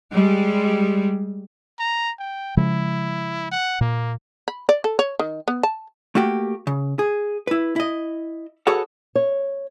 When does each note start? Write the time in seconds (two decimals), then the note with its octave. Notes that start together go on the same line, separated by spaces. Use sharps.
0.11 G3 G#3
1.79 A#5
2.19 G5
2.57 C#3 F3 G#3 E4
3.51 F#5
3.81 A#2 A#3
4.48 B5
4.69 D5
4.84 A4
4.99 C#5
5.19 D#3
5.48 B3
5.63 A5
6.15 A3 A#3 F#4 G4
6.67 C#3
6.99 G#4
7.47 E4 B4
7.76 E4 D#5
8.67 F#4 G#4 A4 B4 C#5 F#5
9.15 C#5